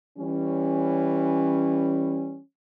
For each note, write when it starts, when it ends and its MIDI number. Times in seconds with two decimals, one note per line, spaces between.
0.18 2.39 52
0.18 2.39 55
0.18 2.39 61